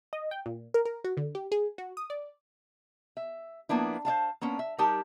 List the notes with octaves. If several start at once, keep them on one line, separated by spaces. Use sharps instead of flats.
D#5
G5
A#2
A#4
A#4
F#4
D3
G4
G#4
F#4
D#6
D5
E5
F3 A#3 B3 D4 E4
C5 D5 F5 A5
A#3 B3 C#4 D4
E5
G3 D#4 G4 A#4 A5